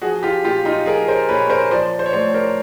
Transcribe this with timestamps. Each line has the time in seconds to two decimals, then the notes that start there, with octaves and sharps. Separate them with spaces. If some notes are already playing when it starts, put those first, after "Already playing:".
0.02 F3 F#4 G#4
0.23 F4 G4
0.44 A#2 F4 G4
0.65 D#4 F4
0.86 F3 G#4 A#4
1.08 A#4 C5
1.29 A#2 B4 C#5
1.50 A#4 C5
1.71 F3 C5 D5
1.99 C5
2.06 C#5
2.13 A2 C5 D5
2.34 A#4 C5